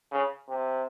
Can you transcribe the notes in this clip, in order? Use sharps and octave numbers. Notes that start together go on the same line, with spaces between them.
C#3
C3